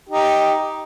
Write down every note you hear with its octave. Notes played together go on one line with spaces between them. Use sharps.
D#4 G4